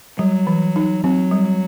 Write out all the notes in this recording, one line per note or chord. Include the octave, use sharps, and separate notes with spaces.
F#3 G3
E3
D#4
F#3 C4
G3